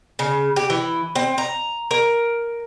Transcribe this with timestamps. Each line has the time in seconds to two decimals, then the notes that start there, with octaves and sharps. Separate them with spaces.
0.19 C#3
0.56 G4
0.70 E3
1.15 C4
1.38 A#5
1.91 A#4